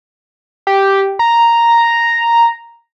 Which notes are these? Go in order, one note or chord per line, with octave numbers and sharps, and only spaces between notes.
G4
A#5